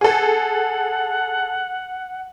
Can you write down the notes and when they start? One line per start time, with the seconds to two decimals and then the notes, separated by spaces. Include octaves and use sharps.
0.01 G#4 A4 F#5